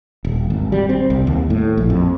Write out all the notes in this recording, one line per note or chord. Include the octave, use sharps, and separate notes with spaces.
D#1
G#1
G3
C4
C2
D#2
A2
A#1
F2